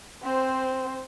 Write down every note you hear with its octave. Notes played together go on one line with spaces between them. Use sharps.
C4 C5